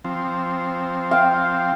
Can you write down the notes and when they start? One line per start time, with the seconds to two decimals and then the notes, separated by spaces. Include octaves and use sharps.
0.05 F3 C4
1.11 F5 G5